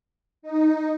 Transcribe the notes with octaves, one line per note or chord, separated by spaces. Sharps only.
D#4